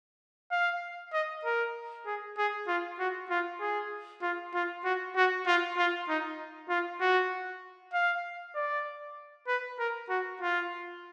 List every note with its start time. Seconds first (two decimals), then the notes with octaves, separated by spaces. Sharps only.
0.51 F5
1.13 D#5
1.45 A#4
2.06 G#4
2.38 G#4
2.68 F4
2.99 F#4
3.30 F4
3.61 G#4
4.22 F4
4.54 F4
4.84 F#4
5.16 F#4
5.47 F4
5.78 F4
6.09 D#4
6.69 F4
7.01 F#4
7.94 F5
8.55 D5
9.48 B4
9.79 A#4
10.09 F#4
10.42 F4